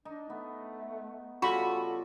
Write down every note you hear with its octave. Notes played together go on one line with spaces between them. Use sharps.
D4 D#4
A3 B3
C#3 G3 F4 F#4 A4 B5 C#6